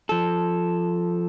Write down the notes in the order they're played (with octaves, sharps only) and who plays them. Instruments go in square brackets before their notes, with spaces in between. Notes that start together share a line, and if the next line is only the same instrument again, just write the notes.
[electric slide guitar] F3 A4